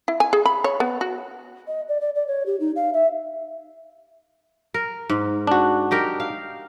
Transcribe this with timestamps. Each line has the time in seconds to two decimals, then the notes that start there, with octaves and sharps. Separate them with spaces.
0.08 E4
0.20 G#5
0.33 G#4
0.46 B5
0.64 C#5
0.80 B3
1.01 F#4
1.67 D#5
1.88 D5
2.00 D5
2.15 D5
2.27 C#5
2.46 G4
2.59 D#4
2.75 F5
2.93 E5
4.74 A#4
5.09 G#2
5.47 D4 F#4
5.91 D#4 G4 A#4
6.20 F5